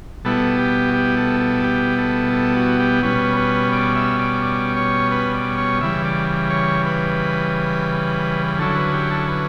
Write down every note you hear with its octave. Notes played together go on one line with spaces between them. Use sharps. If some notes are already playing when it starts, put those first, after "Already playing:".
B2 G3 B3 E4 A4
G4
F#4
G4
A4
A4
G4
A4
A4
F#4
G4
B2 G3 C#4 B4
B4
D5
E5
D5
D5
C#5
B4
D5
C#5
C#3 E3 G3 E5
D5
C#5
B4
D3 F#3 C#4 E4 A4
B4
G4
A4
B4